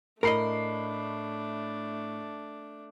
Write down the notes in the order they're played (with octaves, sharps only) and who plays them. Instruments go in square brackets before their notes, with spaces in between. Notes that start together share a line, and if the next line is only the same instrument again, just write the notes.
[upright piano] A2 B5 C7 [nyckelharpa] A3 D4 [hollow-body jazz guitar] A#4 D#5